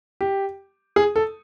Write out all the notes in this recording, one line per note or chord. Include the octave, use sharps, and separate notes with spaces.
G4
G#4
A4